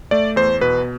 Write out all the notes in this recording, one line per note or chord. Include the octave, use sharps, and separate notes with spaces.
A3 D5
E2 C5
B2 B4